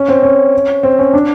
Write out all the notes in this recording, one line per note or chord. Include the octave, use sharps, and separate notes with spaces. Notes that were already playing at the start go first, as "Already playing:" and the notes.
Already playing: C#4
C4
C#4
C4
C#4
D4